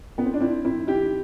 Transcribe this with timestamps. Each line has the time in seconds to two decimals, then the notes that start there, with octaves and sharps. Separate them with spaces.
0.18 B3
0.25 C4
0.34 D4
0.41 C4 E4
0.65 C4 E4
0.87 E4 G4